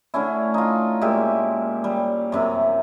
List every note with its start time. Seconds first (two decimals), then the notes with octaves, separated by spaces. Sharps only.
0.14 D3 A3 C#4 E4
0.54 D#4 F4
1.01 A#2 G#3 G4 E5
1.84 G3
2.32 F#2 C3 E5